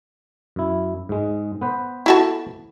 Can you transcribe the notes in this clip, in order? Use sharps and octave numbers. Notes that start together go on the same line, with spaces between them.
F#2 E4
G#2 G#3
B3 B4 C5
E4 F#4 A4